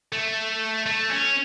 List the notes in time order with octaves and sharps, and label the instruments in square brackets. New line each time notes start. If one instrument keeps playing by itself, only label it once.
[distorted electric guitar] A3
A3
C#4